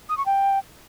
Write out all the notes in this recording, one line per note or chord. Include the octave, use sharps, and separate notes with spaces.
D#6
C#6
G5